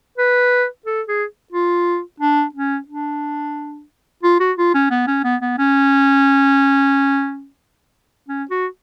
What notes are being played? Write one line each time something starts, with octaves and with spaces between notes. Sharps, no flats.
B4
A4
G#4
F4
D4
C#4
D4
F4
F#4
F4
C#4
B3
C#4
B3
B3
C#4
C#4
F#4